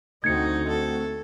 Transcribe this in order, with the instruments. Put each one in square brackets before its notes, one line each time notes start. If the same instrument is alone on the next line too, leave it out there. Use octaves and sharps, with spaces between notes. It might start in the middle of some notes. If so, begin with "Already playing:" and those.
[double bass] D2 [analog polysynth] A3 C4 F#4 [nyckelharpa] D#4 [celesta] G#6 C#7
[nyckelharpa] A4